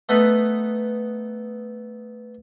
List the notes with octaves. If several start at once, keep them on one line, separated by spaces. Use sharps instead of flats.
A3 B3 D#4 A4 B4